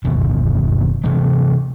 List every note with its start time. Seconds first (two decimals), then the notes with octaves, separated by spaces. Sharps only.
0.04 F#1 D2 B2 D#3
1.04 C3 E3 A3